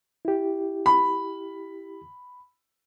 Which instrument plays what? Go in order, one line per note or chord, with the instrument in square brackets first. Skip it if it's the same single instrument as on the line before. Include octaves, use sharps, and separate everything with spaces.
[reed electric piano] E4 G4
[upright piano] B5